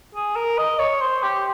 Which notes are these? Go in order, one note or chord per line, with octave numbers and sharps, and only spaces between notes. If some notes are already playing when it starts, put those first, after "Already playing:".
G#4
A#4
D#5
C#5
C5
G4